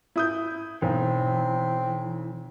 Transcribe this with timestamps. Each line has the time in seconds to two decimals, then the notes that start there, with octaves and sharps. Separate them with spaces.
0.16 E4 D#6 G6
0.82 B1 E3 C4